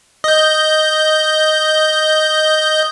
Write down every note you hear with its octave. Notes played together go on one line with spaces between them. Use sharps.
D#5 G6